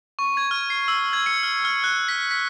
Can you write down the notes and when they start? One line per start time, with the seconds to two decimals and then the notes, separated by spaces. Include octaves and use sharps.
0.19 C#6
0.37 G#6
0.51 F6
0.70 C7
0.88 E6
1.13 G#6
1.26 C#7
1.43 F6
1.65 F6
1.84 F#6
2.08 B6
2.31 B6